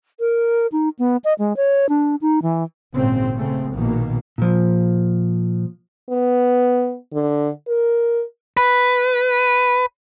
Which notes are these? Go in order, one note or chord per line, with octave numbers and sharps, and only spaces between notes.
A#4
D#4
B3
D#5
G#3
C#5
D4
D#4
E3
G#1 A#2 C#3 C4
C#3 A3 C4
A#1 B2 D#3 A#3
A#2 F3
B3
D3
A#4
B4